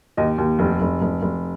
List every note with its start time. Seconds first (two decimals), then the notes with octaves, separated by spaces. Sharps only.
0.17 D#2 D#5
0.38 D#2
0.59 F1
0.81 F1
1.01 F1
1.22 F1